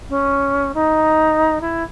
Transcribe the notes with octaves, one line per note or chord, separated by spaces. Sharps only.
C#4
D#4
E4